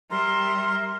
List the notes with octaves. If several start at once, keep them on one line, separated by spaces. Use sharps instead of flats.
G3 A#4 E5 A#5 C6